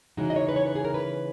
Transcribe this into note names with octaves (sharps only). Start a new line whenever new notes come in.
C#3 E3 G#3 D#4 F#4
D#5
C#5
B4
C#5
B4
G#4
A#4
B4